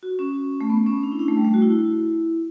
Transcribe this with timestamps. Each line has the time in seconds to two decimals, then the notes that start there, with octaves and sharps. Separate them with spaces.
0.03 F#4
0.19 C#4
0.61 A3
0.70 B3
0.87 C#4
1.03 D4
1.12 E4
1.19 D4
1.28 A3
1.37 G3
1.45 A3
1.54 F#4
1.62 E4